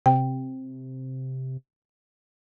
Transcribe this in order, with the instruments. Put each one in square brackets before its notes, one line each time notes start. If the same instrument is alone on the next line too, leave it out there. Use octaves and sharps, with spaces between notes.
[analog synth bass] C3 [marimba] G5